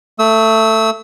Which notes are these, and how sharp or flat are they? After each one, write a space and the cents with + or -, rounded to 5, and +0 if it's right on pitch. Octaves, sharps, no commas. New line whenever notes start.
A3 +15 E6 -35